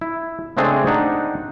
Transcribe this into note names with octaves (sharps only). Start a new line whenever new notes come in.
E4
C#3 G#3 A3 C4 D4 G#4
D4 D#4 F#5